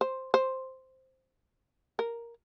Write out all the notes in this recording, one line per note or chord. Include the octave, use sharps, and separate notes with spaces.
C5
C5
A#4